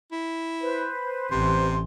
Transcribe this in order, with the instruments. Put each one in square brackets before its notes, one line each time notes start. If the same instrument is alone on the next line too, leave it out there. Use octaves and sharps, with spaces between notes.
[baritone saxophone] E4
[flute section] B4 C5
[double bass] A1 [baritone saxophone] C3 [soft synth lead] C6